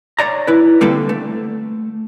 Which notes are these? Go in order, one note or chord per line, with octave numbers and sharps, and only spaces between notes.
C#5 D5 A#5
E4 B4
D3 G3 A#3 C4 A4 B4
A3